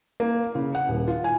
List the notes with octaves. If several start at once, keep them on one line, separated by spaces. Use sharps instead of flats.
A#3
C#3
F#5
D#1
F4
G#5